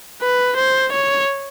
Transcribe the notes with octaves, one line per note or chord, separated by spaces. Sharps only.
B4
C5
C#5